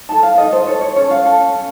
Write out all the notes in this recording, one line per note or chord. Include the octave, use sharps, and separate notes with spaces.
D#4 A4 A5
F5
D#4 A4 D#5
C5
D#4 A4 C#5
C#5
C#4 A4 C#5
F5
C#4 A4
C#4